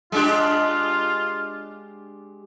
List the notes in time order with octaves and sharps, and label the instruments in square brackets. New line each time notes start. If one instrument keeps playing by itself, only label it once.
[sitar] G#3 D4 G4 [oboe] F4